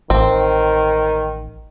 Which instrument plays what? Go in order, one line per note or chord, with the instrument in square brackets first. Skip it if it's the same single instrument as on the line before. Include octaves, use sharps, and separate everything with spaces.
[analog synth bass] A1 [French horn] D#3 [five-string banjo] C4